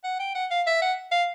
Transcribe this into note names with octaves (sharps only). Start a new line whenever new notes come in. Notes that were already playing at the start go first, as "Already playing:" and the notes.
F#5
G5
F#5
F5
E5
F#5
F5